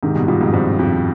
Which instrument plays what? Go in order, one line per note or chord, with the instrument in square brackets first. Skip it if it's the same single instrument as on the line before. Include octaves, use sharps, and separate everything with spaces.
[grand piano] G#2 C3 [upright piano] D#3
[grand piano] G2 B2
[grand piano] G2 B2 [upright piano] F4
[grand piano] F2 G#2
[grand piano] G2 [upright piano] C4
[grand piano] F2 [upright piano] F4